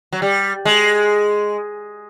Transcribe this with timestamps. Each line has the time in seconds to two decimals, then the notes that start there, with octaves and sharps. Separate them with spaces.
0.12 F#3
0.22 G3
0.65 G#3